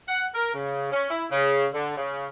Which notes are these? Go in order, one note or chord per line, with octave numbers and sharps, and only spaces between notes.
F#5
A#4
C#3
C#4
E4
C#3
D3
C#3